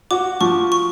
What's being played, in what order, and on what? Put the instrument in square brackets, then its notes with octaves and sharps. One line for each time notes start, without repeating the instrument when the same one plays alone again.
[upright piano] F#4 [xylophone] D6
[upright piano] F3 [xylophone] C#6
[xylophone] C#6